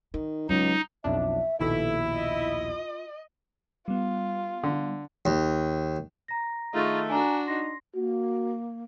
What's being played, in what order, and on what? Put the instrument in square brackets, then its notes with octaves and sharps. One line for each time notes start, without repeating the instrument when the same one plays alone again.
[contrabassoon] D#3 [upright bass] D#4
[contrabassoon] C#2 [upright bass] F#3 [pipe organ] D#4
[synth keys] B1 F2 D4 [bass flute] E5
[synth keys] A#1 D#2 B2 [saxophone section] E4 [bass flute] A4
[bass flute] F4 [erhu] D#5
[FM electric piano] G3 B3 [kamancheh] F4
[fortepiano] D3
[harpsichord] D#2
[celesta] A#5 A#6
[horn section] D#3 A3 [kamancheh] D#4 F4 [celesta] G#4 C#6
[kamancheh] D4 F#4 [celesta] G#5 A#5
[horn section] D#4 [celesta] C6 A#6 C7
[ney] A#3 [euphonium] F#4